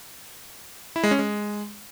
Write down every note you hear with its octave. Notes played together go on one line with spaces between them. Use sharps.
E4
G#3
C#4
G#3